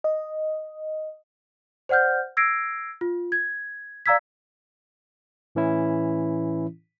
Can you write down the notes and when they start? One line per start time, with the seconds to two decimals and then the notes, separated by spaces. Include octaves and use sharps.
0.04 D#5
1.89 C5 D5 F#5 F6 G6
2.37 E6 G#6 A#6 C7 D7
3.01 F4
3.32 G#6
4.06 D5 F5 A#5 E6 G#6 B6
5.55 A2 E3 C#4 E4